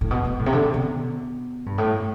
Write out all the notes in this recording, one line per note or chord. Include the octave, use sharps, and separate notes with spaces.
A2
B2
B2
A2
C3
D3
B2
G2
A2